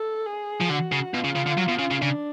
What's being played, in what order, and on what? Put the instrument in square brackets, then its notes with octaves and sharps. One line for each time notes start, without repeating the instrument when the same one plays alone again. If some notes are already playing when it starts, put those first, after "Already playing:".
Already playing: [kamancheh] A4
G#4
[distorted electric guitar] F3
[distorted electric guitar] D3 [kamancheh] F#4
[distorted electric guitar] C#3
[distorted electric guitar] B2 [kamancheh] F4
[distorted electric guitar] C#3
C#3
D3
F#3
B2
C#3
C#3
[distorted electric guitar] C#3 [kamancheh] D4